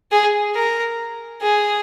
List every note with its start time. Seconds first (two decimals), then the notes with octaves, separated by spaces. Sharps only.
0.11 G#4
0.55 A#4
1.42 G#4